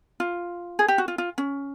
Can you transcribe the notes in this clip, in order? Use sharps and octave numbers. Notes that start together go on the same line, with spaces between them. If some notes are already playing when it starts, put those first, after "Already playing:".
F4
G#4
G4
F#4
F4
F4
C#4